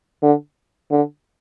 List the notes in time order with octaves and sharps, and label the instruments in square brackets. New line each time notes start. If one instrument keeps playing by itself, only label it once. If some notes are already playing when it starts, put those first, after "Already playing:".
[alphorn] D3
D3